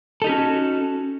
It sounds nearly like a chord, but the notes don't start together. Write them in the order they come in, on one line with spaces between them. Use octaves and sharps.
A4 D#4 G4 C#4 F#4